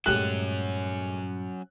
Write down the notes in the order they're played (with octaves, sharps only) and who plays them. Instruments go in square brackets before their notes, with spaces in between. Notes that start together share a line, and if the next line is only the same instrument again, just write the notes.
[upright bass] G2 A#2 [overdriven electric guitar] F#3 C#4 [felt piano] G#3 A3 G4 [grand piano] F#6